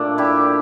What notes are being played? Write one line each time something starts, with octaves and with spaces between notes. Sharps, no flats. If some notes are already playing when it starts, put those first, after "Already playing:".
Already playing: A#2 A3 D4
E4 G4